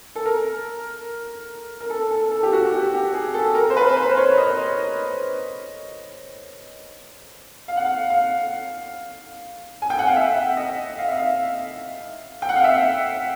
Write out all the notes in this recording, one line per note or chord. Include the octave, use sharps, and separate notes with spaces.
A4
A#4
A#4
A4
A4
A4
G4
F#4
G4
G4
G#4
A4
A#4
C5
B4
C5
C5
C#5
D#5
F5
F#5
F5
F5
G#5
G5
F#5
F5
E5
F#5
D#5
F5
E5
F5
G5
F#5
F5
E5